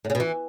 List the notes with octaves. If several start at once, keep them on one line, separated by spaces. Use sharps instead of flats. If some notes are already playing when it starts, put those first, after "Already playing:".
A2
C#3
B2
E3